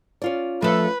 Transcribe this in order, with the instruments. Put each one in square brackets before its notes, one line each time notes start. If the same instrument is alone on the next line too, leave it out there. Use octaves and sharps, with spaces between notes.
[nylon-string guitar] C#4 F4 D5
[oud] F3 A4 F5 [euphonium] A3 [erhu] B4